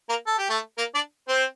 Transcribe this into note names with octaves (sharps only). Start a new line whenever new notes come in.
A#3 A#4
A4
G4
A3 A4
A#3 A#4
D4 D5
C4 C5